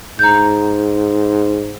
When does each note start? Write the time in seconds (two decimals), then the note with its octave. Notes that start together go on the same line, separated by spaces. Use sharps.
0.19 G#2 A#5 G6